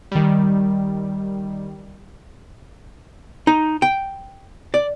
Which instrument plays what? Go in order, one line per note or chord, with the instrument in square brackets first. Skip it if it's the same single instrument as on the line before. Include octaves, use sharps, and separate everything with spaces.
[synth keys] D#3 G3
[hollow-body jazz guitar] D#4
G5
D5